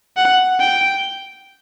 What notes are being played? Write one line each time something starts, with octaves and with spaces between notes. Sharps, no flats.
F#5
G5